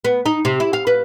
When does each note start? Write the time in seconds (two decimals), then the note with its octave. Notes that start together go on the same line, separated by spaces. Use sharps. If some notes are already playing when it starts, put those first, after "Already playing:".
0.05 B3
0.26 D#4
0.45 C3
0.60 E4
0.73 F5
0.87 B4